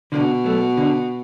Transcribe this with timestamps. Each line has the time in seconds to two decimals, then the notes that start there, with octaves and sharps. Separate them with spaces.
0.12 B2 D3
0.44 F#3 A3
0.77 D3